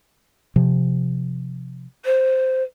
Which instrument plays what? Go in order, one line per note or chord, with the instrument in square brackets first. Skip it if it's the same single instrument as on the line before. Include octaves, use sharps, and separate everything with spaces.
[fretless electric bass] C3 F3
[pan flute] C5